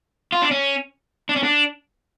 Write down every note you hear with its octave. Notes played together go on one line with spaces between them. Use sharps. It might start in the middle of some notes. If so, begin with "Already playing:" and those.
F4
D4
C#4
D4
C#4
D4